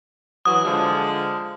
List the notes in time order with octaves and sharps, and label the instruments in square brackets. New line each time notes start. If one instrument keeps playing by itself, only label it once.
[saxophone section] E3 F#3 [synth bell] D#6
[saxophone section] D3 F3 G#3